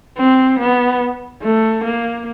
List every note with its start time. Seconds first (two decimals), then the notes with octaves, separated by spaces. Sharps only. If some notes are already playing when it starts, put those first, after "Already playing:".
0.18 C4
0.59 B3
1.42 A3
1.84 A#3